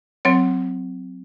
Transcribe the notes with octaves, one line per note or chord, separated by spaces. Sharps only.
F#3 C4 C#5